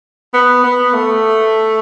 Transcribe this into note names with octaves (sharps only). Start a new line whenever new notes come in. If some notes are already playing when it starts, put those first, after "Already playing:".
B3
B3
A3